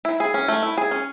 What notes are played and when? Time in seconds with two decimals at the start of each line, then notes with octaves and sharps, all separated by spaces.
0.05 E4
0.20 G#4
0.34 C#4
0.48 A3
0.63 E4
0.78 G#4
0.91 C#4